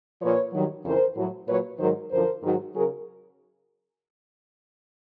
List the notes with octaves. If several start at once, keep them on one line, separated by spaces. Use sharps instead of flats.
A#2 F3 B4 C#5
G2 D#3 F#3
F2 C#3 E3 A#4 C5
A2 F#3
A#2 F#3 B4 C#5
G#2 D#3 F#3 A#4 C5
F#2 D3 F3 A#4 C5
G#2 D#3 F#3
C#3 F#3 G#4 A#4